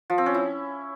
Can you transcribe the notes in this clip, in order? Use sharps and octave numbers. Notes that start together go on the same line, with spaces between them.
F3
C4
C#4
E4